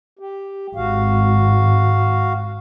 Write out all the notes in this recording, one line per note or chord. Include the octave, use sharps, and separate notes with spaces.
G4
G#1 F#4 F5